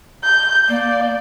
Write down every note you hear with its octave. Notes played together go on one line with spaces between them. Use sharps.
G6
A#3 D5